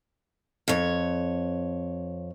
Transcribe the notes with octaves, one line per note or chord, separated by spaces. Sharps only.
F2 C#5